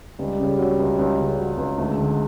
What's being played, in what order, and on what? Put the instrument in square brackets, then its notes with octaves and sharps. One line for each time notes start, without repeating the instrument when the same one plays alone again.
[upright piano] C#2 [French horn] G3
[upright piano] C#3
F#3
C#2
C#2
C#3
F#3
C#2
[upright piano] D2 [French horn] G#3
[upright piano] D3